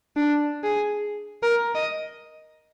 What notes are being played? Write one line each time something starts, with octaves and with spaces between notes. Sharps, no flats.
D4
G#4
A#4
D#5